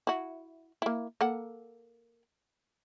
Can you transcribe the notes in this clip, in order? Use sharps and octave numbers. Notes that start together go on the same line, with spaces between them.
E4 F#4
A#3 E4
A#3 A4 F#5